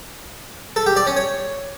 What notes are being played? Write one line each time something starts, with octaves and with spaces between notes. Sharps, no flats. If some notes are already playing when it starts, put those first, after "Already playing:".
A4
G4
D5
C#4
C#5